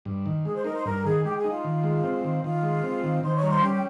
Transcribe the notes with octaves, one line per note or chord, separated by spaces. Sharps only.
G2
D#3
G#3 G#4
C5
D#4 A#4
C5
G2 A#4
D#3 G#4
G#3 G4 G5
G#4 G#5
D#4
F4 F5
D#3
G#3
C4
D#3
D#3 F4 F5
G#3
C4
D#3
D#3 C5 C6
C#5 C#6
G3 A#5
C5 C6
C#4 G4 G5
G5